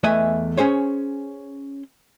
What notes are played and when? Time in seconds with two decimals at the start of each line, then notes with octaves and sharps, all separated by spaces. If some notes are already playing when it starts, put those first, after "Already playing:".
0.03 E2 A3 B4 D#5 E5 G#5
0.57 C#4 G#4 C5 C#5